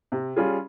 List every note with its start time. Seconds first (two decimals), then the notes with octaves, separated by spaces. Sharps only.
0.12 C3
0.36 G3 C#4 F4 G#4